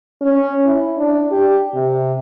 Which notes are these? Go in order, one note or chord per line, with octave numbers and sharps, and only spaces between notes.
C#4
E4
D4
G4
C3